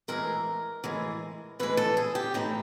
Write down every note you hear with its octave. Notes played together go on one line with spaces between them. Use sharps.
A2 E3 G#3 A#4
A2 E3 G#3
A2 E3 G#3 B4
A4
G#4
G4
A2 E3 G#3 D#4